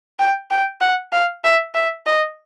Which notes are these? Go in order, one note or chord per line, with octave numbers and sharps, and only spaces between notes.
G5
G5
F#5
F5
E5
E5
D#5